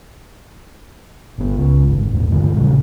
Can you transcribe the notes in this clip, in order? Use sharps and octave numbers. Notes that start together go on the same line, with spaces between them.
G1 B3
C#2 C#3
G1 G#2
A1 D#2
G2 D3 F3 G#3
A1 A#2 C#3 G3